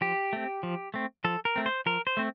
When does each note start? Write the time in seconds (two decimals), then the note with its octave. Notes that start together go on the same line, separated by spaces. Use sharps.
0.01 F3 G4
0.33 A3 C4
0.63 F3
0.94 A3 C4
1.24 F3 A4
1.45 A#4
1.56 A3 C4
1.66 C5
1.86 F3 A#4
2.07 C5
2.17 A3 C4